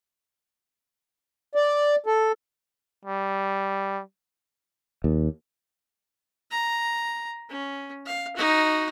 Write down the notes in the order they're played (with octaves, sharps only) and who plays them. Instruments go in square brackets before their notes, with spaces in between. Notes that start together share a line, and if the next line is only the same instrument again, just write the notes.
[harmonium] D5
A4
[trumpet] G3
[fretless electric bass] D#2
[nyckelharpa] A#5
C#4
F5
D#4 F#4